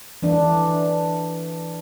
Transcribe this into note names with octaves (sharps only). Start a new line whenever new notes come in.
E3 D4